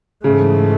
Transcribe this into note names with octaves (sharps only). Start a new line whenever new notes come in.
G#2 C#3 E3 A3